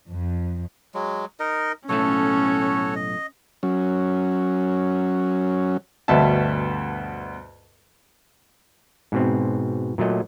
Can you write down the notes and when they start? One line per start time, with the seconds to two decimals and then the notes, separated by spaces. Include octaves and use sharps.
0.10 F2
0.94 F#3 G#3
1.40 D#4 A#4 D#5
1.89 B1 A2 A3 C#4 F#4 A4 C#5
2.96 D#5
3.63 F#3 C#4
6.08 D2 G2 B2 E5 A5
9.12 G#2 B2 C4
9.98 A#2 F#3 A3 D#5